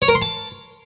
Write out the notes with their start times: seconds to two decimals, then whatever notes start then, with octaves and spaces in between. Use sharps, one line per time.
0.02 C#5
0.08 A#4
0.15 C6
0.22 A5